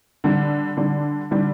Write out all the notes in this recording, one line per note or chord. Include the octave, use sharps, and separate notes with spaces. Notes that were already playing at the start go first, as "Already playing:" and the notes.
D3 G3 D4
D3 G3 D4
D3 G3 D4